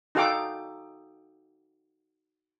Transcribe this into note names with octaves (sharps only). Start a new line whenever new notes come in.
D#4 F#4 A4 F5 G5 D6